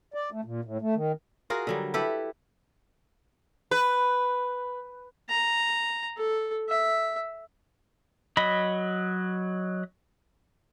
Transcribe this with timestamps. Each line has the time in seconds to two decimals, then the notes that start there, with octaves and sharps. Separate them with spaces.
0.14 D5
0.32 A3
0.45 A#2
0.65 A2
0.81 A3
0.95 D#3
1.50 F4 F#4 G#4 A#4
1.67 D3 F#3 G3
1.94 E4 G4 A4 B4
3.71 B4
5.29 A#5
6.17 A4
6.69 E5
8.37 F#3 D#5 B5